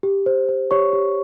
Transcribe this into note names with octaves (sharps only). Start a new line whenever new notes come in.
G4
C5
C5
G4 C#5 C#6
G4